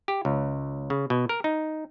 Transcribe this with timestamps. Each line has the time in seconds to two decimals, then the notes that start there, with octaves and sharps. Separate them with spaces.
0.08 G4
0.25 C#2
0.90 C#3
1.10 B2
1.29 A#4
1.44 D#4